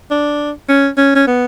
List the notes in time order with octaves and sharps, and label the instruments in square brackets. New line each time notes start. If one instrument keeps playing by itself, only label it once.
[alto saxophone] D4
C#4
C#4
C#4
B3